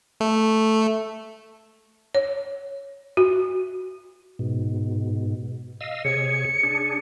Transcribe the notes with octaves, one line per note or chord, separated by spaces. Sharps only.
A3
C#5
F#4
G#2 B2
D#5 F5 E6
C3 G#4 C#5 C#7
D4 G#4